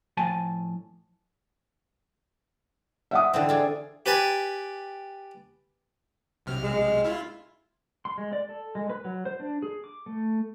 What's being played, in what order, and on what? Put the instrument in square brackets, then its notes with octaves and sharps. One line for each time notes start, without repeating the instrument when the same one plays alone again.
[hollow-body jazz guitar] A2 F3 G#5 A5
[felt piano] E5 F#5 D#6
[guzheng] D3 E3 C4
F4 G#4 D5
[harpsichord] G4 B4 G#5 A5
[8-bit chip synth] B1 C3 F6
[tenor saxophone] G#3
[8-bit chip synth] E4 F4
[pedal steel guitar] C6
G#3
D5
A4
G#3
B4
F#3
C5
D4
G#4
D6
A3